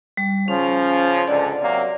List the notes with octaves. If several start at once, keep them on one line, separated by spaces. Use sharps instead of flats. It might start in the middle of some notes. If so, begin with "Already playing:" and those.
G3
C#3 F3 C#4
C#2 G#2 D3 D5
C3 F#3 A#3